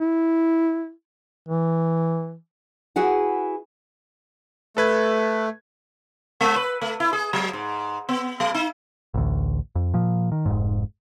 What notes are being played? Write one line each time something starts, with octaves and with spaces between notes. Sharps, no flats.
E4
E3
E4 F#4 G#4 B4 F#5
A3 A4 B4 G#6
G#3
B4
A3
E4
G#4
F#3
G#2
B3
G3
D#4
A1 D2
F2
A#2 F3
D#3
F1 F2 G#2